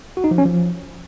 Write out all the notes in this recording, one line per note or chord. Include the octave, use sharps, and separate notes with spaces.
F#4
D#4
F3
C#4
F3